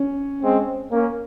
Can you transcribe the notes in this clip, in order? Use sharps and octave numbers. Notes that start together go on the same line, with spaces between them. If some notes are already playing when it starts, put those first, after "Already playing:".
Already playing: C#4
G#3 C4
A#3 C#4